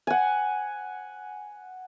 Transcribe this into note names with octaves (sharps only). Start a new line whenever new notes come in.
F#5 G#5